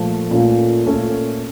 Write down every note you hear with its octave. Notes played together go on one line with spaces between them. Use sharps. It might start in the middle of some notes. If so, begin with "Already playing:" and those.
Already playing: A#2 F3 A3
A#2 A3 C#4
A#2 A3 C#4 F4 A4